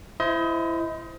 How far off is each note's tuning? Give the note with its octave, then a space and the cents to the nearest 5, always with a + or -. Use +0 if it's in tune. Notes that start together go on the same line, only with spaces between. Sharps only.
E4 +20 C5 -15 D#5 +30